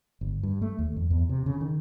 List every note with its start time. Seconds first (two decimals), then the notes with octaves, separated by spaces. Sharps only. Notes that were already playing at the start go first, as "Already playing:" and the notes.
0.21 G1
0.43 G2
0.62 A3
0.79 D#2
0.97 F2
1.11 E2
1.29 C3
1.46 C#3
1.61 D#3